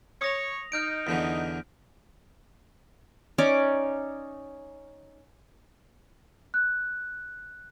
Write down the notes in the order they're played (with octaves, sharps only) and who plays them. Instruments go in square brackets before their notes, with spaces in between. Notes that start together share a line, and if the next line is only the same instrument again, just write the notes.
[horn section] C#5 [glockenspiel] D#6 A#6 F7
[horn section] D#4 [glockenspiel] F6 G6 D7
[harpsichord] E2 D3 E3
[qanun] C#4 D#4 D5 D6
[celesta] F#6